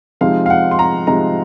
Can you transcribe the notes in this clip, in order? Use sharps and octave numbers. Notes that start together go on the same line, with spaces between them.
C3 F3 G#3 C4 D#4 F5
F5
F#5
C6
A#5
C3 F3 G#3 C4 D#4 A#5